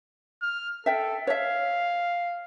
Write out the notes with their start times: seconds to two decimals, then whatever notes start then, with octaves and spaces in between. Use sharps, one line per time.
0.42 F6
0.86 A4 E5 G5
1.27 C#5 E5 F5